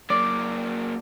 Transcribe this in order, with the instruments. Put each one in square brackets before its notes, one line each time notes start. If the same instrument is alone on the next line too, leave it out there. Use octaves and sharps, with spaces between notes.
[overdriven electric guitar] F#3 A#3 [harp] D5 D6